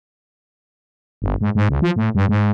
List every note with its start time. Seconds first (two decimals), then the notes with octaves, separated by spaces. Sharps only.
1.22 G1
1.41 G#2
1.55 G#2
1.69 C#2
1.82 F3
1.96 A2
2.15 G2
2.29 G#2